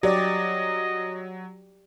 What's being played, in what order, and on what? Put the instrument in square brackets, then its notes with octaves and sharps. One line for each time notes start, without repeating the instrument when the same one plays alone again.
[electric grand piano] F#3 [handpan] G4 D5 [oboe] D#5